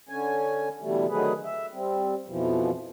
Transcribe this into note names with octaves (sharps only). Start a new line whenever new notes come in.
D3 C#4 G#5
B2 D3 E3 G3 A3
D3 D#3 F#3 A3 G#4 B4
E5
G3 C4
F2 B2 E3 F3